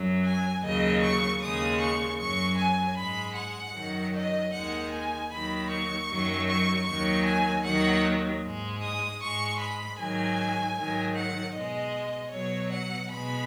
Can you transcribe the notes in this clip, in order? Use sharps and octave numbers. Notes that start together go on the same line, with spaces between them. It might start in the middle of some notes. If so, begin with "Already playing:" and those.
Already playing: F#2 F#3
G#5
D#2 C#3 F#3 D#5
C#6
D#2 C#3 G#3 D#6
C#6
F#2 F#3 C#6
G#5
G#2 G#3 B5
F#5
F#2 D#3 F#3
D#5
D#2 D#3 G#3 F#5
G#5
D#2 D#3 F#3 B5
C#6
F#2 D#3 F#3
C#6
D#2 D#3 F#3 C#6
G#5
D#2 D#3 F#3 F#5
G#2 G#3
D#6
G#2 G#3 C#6
B5
G#2 D#3 F#3 G#5
G#2 D#3 F#3
F#5
B2 G#3 D#5
B2 F#3 C#5
F#5
B2 G#3 B5